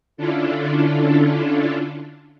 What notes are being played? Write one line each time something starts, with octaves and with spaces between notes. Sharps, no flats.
D3 C#4 D4 E4 F4 A4